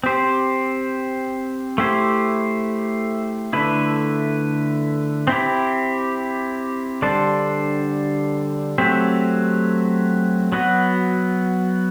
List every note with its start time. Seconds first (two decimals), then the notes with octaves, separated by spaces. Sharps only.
0.04 C4 G4 C5
1.78 A3 E4 G4 C5
3.53 D3 A3 E4 B4
5.27 C4 E4 G4
7.02 D3 G3 D4 A4 C5
8.78 F#3 A3 C4 G4
10.52 F#3 B3 F#4